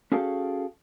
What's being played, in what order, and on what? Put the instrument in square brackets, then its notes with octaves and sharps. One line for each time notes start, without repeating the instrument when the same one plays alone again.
[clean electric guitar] C#4 F#4 G#4 A4 F5 G5